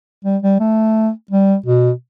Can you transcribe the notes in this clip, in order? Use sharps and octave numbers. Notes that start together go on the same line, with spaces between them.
G3
G3
A3
G3
B2